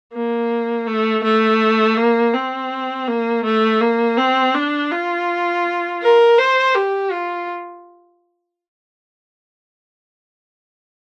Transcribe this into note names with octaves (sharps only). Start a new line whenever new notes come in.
A#3
A3
A3
A#3
C4
A#3
A3
A#3
C4
D4
F4
A#4
C5
G4
F4